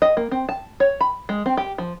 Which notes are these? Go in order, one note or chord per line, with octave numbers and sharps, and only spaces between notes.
D#5
A#3
C4
A5
C#5
B5
G#3
C4
G4
F3